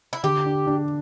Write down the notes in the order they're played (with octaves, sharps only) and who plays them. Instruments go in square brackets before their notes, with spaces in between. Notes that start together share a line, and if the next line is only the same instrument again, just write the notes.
[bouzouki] E4
[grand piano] D3 [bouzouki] G4
[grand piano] D4
D4